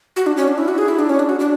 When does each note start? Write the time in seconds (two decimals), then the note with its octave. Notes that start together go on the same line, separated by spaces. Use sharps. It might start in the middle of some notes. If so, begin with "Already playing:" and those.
0.16 F#4
0.26 D4
0.37 C#4
0.48 D4
0.58 E4
0.68 F#4
0.78 G#4
0.88 E4
0.99 D4
1.09 C#4
1.19 D4
1.29 F#4
1.40 D4